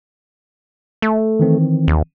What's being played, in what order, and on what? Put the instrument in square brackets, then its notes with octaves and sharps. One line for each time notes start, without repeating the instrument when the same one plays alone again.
[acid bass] A3
[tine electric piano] D#3 E3 C4
[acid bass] D#2